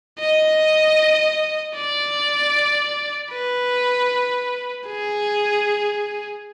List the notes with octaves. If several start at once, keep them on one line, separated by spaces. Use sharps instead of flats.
D#5
D5
B4
G#4